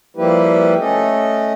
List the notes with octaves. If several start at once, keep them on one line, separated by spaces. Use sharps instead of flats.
F3 G3 A#3 E4 G4 B4
A3 C#4 A4 D#5